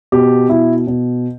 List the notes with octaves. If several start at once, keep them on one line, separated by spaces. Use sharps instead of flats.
B2 G4
B2 E4
B2